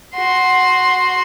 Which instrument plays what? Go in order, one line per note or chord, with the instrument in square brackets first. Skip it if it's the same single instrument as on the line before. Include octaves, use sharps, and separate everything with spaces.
[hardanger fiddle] F#4 C6